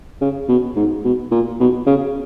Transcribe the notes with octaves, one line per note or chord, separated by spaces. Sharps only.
C#3
B2
G#2
B2
A#2
B2
C#3